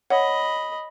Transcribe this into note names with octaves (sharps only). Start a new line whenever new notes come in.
C#5 D#5 F#5 B5